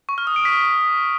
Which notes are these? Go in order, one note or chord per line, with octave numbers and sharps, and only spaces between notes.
C#6
F6
D#6
D7
B6